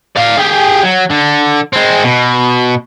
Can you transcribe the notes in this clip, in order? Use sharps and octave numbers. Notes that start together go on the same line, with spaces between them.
D5 F5
G4 G#4
F#3
D3
G#3 C4
B2